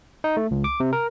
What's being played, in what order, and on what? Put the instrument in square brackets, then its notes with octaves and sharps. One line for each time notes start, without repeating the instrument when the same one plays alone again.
[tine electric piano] D#4
A3
C#2
D6
C3
A#4